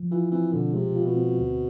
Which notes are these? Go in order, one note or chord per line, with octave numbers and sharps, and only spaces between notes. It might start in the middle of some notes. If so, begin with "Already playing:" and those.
Already playing: F3
E3 F4
E3 C4
B2 D3
C3 G#3
F4
B2
C4
D2